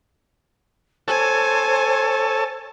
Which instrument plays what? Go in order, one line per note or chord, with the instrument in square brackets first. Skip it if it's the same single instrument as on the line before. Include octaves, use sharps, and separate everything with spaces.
[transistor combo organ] A4 C#5 A5 [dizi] C5 [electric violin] G#5